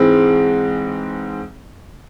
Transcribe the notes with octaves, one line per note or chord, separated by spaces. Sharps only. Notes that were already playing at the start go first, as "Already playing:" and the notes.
Already playing: G#2 E3 G#3 C4